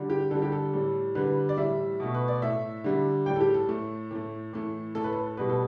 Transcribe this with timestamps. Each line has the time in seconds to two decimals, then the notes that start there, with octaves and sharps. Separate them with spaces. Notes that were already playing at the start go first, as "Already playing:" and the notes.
Already playing: D3 G3
0.10 G4
0.31 D3 G3 A4
0.42 G4
0.52 A4
0.73 A2 G3
1.15 D3 G3 B4
1.49 D5
1.57 A2 E3 G3 E5
2.00 B2 A3
2.15 B4
2.28 D5
2.42 A2 A3 E5
2.84 D3 G3
3.26 A2 G3 G5
3.36 A4
3.40 G4
3.54 A4
3.69 A2 A3
4.11 A2 A3
4.53 A2 E3 A3
4.95 A2 A3 A4
5.04 B4
5.13 A4
5.37 B2 G3 B4
5.50 A4